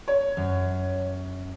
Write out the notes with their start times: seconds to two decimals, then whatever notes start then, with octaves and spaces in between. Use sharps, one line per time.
0.08 C#5
0.37 F#2